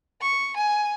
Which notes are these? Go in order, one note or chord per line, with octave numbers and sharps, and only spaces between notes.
C#6
G#5